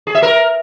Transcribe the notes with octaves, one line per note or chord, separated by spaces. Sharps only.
G#4
E5
A#4